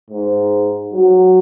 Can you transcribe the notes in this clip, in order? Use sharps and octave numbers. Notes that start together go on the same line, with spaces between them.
G#2
F#3